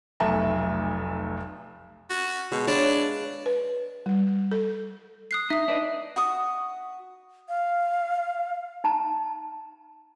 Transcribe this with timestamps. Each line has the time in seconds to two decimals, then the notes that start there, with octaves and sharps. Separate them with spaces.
0.20 F1 B1 A3 E5 A5 A#5
2.10 F#4
2.52 B2 G#3
2.67 D4 B4 C#5 F5
3.46 B4
4.06 G3
4.51 A4
5.31 D#6 F#6 C7
5.50 D#4 E5 D#6
5.68 D4 B4 D#5
6.16 F#4 C#6 D#6
7.49 F5
8.84 D#4 A5 A#5